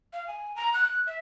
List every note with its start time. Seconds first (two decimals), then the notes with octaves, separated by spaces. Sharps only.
0.13 F5
0.28 G#5
0.56 A#5
0.74 F#6
1.07 E5